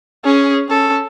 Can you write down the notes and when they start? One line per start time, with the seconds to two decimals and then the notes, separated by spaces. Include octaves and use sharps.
0.25 C#4 G#4
0.69 C#4 A4